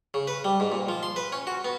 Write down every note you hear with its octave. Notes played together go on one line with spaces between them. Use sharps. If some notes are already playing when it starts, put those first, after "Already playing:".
C#3
B4
G3
G#2
A#2
F3
C6
B4
C#4
F#4
B3